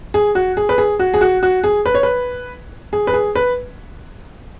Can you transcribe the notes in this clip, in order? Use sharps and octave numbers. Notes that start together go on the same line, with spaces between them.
G#4
F#4
G#4
B4
G#4
F#4
G#4
F#4
F#4
G#4
B4
C#5
B4
G#4
B4
G#4
B4